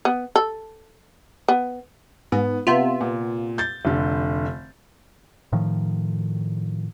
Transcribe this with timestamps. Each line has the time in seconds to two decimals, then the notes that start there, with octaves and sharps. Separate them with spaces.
0.05 B3
0.36 A4
1.48 B3
2.32 G#2 B3
2.67 C3 B3 F4 E5
3.01 A#2
3.58 G6 A6
3.85 F1 D3
5.52 A2 D#3 F3